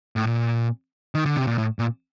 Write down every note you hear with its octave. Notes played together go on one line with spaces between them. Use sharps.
A2
A#2
D#3
D3
C3
A#2
A2
A#2